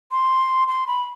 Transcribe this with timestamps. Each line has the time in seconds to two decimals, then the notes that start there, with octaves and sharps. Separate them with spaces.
0.11 C6
0.68 C6
0.87 B5